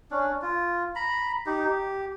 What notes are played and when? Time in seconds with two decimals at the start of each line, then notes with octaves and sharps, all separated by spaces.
0.11 C#4 D4
0.42 F4
0.95 A#5 B5
1.46 D#4 G4
1.65 G4